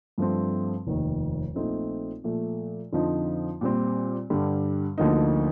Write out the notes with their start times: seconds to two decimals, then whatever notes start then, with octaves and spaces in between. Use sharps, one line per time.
0.18 G2 F3 A3 C4
0.87 F1 D#2 D#3
1.55 A#1 A#2 A3 C4 D#4
2.24 A#2 F3 A3
2.92 F2 D3 F3 C4 D#4
3.61 A#2 G3 C4
4.30 G2 D3 G3
4.98 D2 D3 F3 A#3 D#4